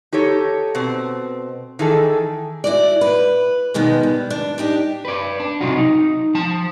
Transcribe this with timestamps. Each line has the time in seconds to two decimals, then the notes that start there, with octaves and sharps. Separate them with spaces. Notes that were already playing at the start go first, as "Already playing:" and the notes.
0.12 D#4 G4 A4 C#5
0.75 B2 C4
1.79 D#3 E3 G#4 A4
2.64 E4 F#4 D5
3.01 B4
3.74 B2 D#3 G#3 B3
4.03 G3
4.30 D4
4.58 D4 D#4 G4
5.05 B4 D5
5.40 D4
5.61 C3 F#3 D#4 F4 F#4
5.77 D#4
6.35 F3 A5